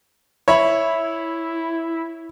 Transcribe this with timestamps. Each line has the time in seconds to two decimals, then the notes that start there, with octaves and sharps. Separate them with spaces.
0.48 E4 C#5 E5 B5